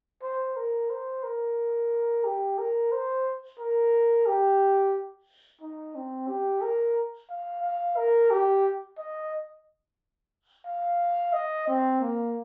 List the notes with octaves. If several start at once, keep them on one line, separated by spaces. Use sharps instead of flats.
C5
A#4
C5
A#4
G4
A#4
C5
A#4
G4
D#4
C4
G4
A#4
F5
F5
A#4
G4
D#5
F5
D#5
C4
A#3